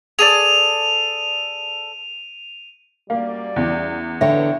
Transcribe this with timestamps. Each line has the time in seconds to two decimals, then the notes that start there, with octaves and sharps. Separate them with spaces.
0.19 G#4 A4 D5 D#7 F7
3.10 F#2 G3 A#3 D5 F5
3.56 E2 C#4
4.21 D3 B3 C#5 E5 G5